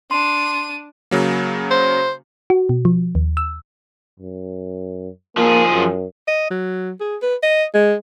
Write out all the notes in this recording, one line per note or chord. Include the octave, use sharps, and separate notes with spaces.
D4 C6 D#7
C#3 F#3 A#3
C5
F#4
B2
F3
D#2
E6
F#2
F3 A#3 G#4
F#2
D#5
F#3
G#4
B4
D#5
G#3